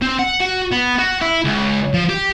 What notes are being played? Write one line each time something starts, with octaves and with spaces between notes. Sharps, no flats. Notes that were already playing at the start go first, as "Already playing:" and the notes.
C4
F#5
F#4
B3
F#4
E4
C#2
F3
G4